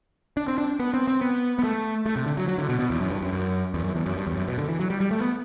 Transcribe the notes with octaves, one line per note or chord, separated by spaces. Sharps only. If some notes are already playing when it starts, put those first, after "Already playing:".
D4
C4
D4
B3
C4
C4
B3
B3
A3
A3
C3
D3
F#3
F#3
D3
B2
B2
E2
F#2
G2
F#2
F#2
E2
F#2
E2
F#2
G2
E2
F#2
B2
D3
E3
F#3
G3
G3
A3
B3